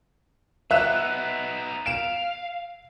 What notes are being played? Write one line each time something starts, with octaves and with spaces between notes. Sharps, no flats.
B3 D#4 E5 F#6 E7
F5 D7 E7